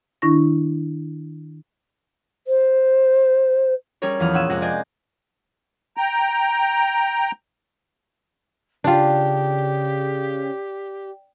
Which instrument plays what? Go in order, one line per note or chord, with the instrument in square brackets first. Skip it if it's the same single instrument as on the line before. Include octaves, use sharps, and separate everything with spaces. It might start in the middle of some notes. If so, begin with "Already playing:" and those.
[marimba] D#3 D4 E4 C#6 A#6
[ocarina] C5
[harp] G3 C#4 G#4 A#4 C#5
E2 F3 D#6 F6
A#2 C#4 F#5 E6 D#7 E7
F2 C3 G#3 F#5 A#6
C4 C5 D5 D#5 G#5
[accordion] G5 A#5
[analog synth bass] C#3 [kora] D4 F4 [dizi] G4 [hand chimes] D5 G5